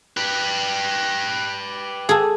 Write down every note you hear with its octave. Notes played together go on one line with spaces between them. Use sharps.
G4 B4
G#4 A4